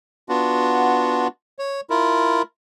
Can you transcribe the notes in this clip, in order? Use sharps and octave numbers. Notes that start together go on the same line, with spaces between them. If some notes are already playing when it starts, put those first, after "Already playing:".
B3 D4 F4 F#4
C#5
E4 F4 A#4